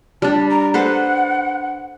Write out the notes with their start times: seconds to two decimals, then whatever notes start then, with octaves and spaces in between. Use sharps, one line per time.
0.22 G3 D4 A5
0.51 A#5
0.74 A4 B4 C5 F#5